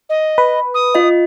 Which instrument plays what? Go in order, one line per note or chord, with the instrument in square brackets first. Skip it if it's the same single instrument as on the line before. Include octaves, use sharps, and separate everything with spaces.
[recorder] D#5
[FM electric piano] B4
[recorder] D#6
[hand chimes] F4 D#5